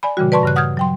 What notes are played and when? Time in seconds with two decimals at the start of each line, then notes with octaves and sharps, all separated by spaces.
0.03 D5 G#5 B5
0.17 A#2 C#3 E3 G3 F#4
0.32 B4 D5 A5 C6 C#6
0.43 G2 C#3 F#6
0.56 F#5 D#6 F6 G6 G#6
0.77 F#3 G5 C6